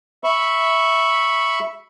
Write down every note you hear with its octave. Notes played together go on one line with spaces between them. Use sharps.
E5 B5 C#6